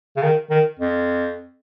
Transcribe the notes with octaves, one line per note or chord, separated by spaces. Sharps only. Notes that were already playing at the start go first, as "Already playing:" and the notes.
C#3
D#3
D#3
F2